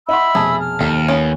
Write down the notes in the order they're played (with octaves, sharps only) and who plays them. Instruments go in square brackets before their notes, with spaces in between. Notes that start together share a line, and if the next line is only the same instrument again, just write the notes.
[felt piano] D#5 F#5 C6 [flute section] E5 B5 E6
[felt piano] F1 B2 A5 [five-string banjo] G#4
[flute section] F6
[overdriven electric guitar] D#2 [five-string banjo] A4
[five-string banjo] B3 C#4